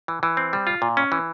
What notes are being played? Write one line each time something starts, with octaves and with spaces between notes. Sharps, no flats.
E3
E3
C4
G3
F4
A#2
C#4
E3